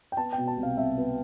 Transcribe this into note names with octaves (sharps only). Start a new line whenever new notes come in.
G5
B3 A5
G5
B2
A5
C2
F5
C2 E5
B3